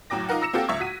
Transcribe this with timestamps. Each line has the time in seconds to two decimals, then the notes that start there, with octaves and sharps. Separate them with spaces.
0.10 F#1 A2 F#3 G5 D6 A#6
0.29 D#4 F4 A#4 F#5
0.41 A#5 E6 A#6 C#7 E7
0.53 A#3 C4 F#4 G4 A4 F5
0.68 C#2 E5 C#6 G#6
0.80 F#4 B6 D#7